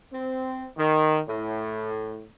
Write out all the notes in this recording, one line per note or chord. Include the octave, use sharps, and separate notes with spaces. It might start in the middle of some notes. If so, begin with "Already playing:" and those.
C4
D#3
A2